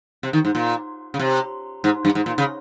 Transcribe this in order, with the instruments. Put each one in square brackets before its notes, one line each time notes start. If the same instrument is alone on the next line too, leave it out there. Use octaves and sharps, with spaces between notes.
[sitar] C3
D#3
G#2
A#2
C#3
C3
G#2
G2
G#2
A#2
C#3